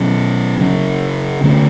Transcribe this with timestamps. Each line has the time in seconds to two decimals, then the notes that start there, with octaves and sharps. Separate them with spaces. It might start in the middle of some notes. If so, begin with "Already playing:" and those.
Already playing: B2 F#3 C#4
0.60 C#3 F#3 C#4
1.44 D3 A3 C#4